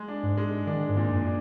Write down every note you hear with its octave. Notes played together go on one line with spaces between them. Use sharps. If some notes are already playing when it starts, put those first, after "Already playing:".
Already playing: G#3
D4
G#2
G#3
D#3 D4
G#2
A#2
F#2
D4